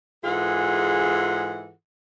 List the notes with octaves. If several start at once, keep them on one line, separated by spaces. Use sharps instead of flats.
G#2 E3 F4 G#4 A4 F#5